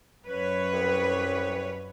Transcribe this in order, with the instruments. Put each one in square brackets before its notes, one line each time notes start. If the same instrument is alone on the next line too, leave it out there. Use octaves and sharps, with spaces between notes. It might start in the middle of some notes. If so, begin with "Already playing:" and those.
[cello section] F#2 B4 C#5
[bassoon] C2